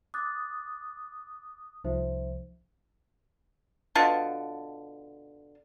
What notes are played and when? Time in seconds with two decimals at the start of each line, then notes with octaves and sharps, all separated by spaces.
0.14 D6 D#6 F#6 A6
1.84 C2 F3 D#4 C5 E5
3.95 B2 D3 F4 A5